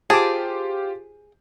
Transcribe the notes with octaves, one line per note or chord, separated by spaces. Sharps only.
F4 G4 G#4 C5 A5 D6